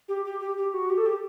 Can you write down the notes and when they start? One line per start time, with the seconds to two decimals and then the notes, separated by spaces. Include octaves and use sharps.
0.09 G4
0.25 G4
0.40 G4
0.57 G4
0.74 F#4
0.90 G4
0.98 A4
1.06 G4